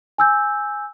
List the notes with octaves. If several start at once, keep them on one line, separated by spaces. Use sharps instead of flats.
G#5 E6 G6